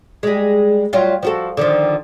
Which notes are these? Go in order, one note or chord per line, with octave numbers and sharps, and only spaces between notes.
G3 G#3
F#3 G3 F4
F3 F#4 A4
D3 D#3 F3